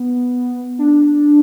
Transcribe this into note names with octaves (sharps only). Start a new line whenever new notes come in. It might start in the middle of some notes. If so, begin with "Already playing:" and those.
Already playing: B3
D4